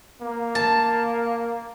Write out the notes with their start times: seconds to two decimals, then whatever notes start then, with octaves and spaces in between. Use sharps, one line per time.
0.22 A#3
0.55 A5